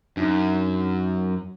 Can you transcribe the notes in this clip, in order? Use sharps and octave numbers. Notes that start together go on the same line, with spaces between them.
F#2 D4 D#4